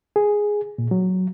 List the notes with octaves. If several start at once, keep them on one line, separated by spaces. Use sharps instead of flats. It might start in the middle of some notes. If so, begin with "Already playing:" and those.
G#4
A#2
F#3